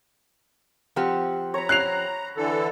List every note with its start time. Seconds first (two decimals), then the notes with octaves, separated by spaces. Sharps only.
0.96 F3 C4 G4 F#5
1.54 C#5 A#5 B5
1.69 F#6 C7 F7
2.37 D3 E3 A4